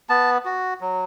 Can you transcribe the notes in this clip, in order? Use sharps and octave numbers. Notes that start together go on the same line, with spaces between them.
B3 A5
F#4
F#3